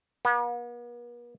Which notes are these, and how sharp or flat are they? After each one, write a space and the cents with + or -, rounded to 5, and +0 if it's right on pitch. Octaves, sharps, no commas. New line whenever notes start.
B3 -45